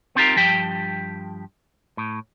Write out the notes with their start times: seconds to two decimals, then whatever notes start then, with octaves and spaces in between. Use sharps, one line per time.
0.15 B3 C4 D#4 F4 G4 A#4
0.36 G2 F3 G4 G5
1.97 A2